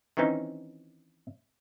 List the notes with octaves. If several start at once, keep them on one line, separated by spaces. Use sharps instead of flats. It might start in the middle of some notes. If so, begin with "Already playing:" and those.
D#3 E3 C4 C#4 D#4